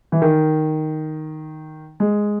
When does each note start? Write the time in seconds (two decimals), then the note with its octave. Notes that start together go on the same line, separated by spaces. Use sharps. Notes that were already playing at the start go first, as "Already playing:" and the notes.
0.12 E3
0.22 D#3
2.00 G#3